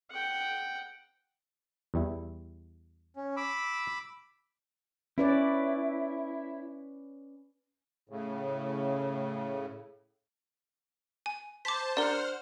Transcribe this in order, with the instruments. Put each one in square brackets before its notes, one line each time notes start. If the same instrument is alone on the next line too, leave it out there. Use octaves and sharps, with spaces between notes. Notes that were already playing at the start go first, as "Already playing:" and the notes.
[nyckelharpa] F#5 G5
[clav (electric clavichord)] E2 G3 E4
[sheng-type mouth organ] C#4
B5 D6 E6
[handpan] C#4 B4 D5 [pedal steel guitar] E4
[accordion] A2 C#3
[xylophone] G#5
[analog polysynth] C5 A5 [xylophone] D6 B6
[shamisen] D4 G4 A#4 [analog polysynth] C5 F#5 F6 [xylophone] D5 G7